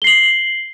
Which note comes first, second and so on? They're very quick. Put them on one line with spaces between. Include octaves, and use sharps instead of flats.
G7 C7 F#7